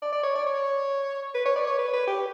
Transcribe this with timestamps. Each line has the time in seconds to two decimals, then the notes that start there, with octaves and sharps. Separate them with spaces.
0.02 D5
0.13 D5
0.24 C#5
0.35 D5
0.46 C#5
1.34 B4
1.46 C#5
1.56 D5
1.67 C#5
1.78 B4
1.93 B4
2.07 G4